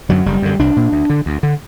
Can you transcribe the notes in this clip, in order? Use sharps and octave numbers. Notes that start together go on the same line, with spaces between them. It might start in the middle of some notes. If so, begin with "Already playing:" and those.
F#2 D3 F#3
F#1 G3
F#2 D3
C2 D4
A#2
D2
D3
D2
D3